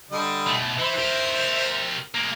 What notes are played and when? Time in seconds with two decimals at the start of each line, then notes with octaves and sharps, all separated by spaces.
0.11 D3 G3 D#5
0.47 B2 A3
0.79 E3 C5 E5
0.99 G4 A#4
2.15 G#3 A#3